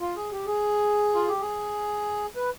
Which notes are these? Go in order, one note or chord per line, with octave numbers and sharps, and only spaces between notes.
F4
G#4
G4
G#4
F4
G4
G#4
B4